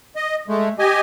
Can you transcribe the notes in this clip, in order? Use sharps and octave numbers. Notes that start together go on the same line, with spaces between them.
D#5
G#3 A3
G4 D#5 G#5